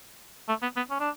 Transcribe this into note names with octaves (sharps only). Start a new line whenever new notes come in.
A3
B3
B3
C#4
D4